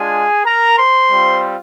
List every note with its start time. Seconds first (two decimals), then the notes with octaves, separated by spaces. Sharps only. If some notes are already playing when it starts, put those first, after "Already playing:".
Already playing: G#3 D4 F4 G#4 G#5
0.45 A#4 A#5
0.78 C5 C6
1.10 G3 C4 F4